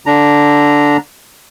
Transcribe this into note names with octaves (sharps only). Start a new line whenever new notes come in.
D3 D4 A#5